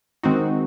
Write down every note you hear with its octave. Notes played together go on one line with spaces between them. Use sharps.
D#3 G#3 C4 D#4 F#4